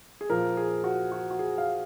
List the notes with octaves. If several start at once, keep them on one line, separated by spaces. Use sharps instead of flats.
G#4
A#2 F3 A#4
G#4
F#4
F#4
F#4
G#4
F5